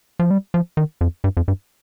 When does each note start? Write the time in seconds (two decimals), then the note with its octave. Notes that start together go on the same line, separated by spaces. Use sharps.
0.19 F3
0.31 G3
0.54 F3
0.77 D#3
1.01 F2
1.24 G2
1.37 F2
1.48 G2